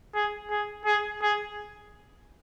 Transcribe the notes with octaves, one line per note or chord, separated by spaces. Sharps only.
G#4
G#4
G#4
G#4